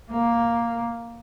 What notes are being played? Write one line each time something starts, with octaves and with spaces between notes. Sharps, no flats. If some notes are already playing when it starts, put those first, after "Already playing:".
A#3